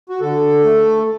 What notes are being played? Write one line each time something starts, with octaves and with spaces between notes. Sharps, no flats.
F#4
D3 A4
A3